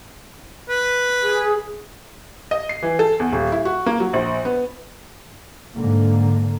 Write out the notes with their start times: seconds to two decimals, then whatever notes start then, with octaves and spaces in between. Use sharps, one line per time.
0.69 B4
1.23 G#4
2.51 D#5
2.69 C7
2.83 E3
2.99 A4
3.20 E2
3.32 D#1
3.52 E4
3.65 F#4
3.86 A#3
4.00 F#3
4.13 A#1
4.45 B3
5.75 G#2 D3 A#3